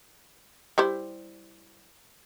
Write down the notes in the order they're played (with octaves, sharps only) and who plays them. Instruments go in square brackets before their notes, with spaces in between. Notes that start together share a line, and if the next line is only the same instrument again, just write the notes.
[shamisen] G3 E4 C5